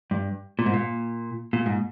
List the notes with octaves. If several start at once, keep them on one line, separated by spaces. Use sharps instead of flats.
G2
A#2
G#2
A#2
A#2
G#2